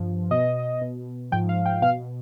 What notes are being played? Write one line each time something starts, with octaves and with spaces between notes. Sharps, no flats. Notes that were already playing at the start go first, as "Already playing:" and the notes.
Already playing: G2 F3
B2 D#5
B2
G#2 F3 G5
F5
G5
B2 F5